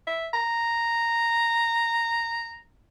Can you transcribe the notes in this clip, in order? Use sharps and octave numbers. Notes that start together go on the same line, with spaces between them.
E5
A#5